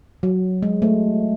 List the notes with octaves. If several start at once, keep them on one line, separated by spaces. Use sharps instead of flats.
F#3
G#3
A3